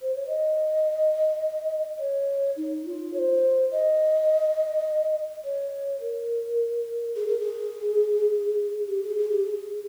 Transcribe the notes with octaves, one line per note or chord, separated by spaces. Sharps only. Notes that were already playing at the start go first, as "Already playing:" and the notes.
C5
C#5
D#5
C#5
D#4
F4
C#5
C5
D#5
C#5
A#4
G#4
A#4
G#4
G4
G#4
G#4
G4
G#4